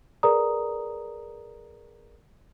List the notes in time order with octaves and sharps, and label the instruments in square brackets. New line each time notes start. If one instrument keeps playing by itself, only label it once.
[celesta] G#4 A#4 B4 D5 A#5 D#6